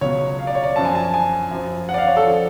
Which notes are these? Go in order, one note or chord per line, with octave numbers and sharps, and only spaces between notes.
C#2 B2 F#3 C#5
F5
D5
C#5
D5
F#2 F3 A5
G#5
A5
G#5
G#5
F#2 F3
F#5
D5
F5
C#5
A4
F3